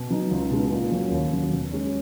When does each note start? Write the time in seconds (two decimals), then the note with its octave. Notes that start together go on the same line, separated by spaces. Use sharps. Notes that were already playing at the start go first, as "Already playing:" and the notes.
Already playing: B2
0.10 F#3 B3 D#4
0.31 C#2
0.51 B2 G#3 D#4
0.71 A#2
0.91 F#3 C#4
1.11 D#2
1.31 C#3 F#3
1.51 B2
1.72 G#3 C#4